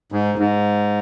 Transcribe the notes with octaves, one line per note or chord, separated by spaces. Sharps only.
G#2
G#2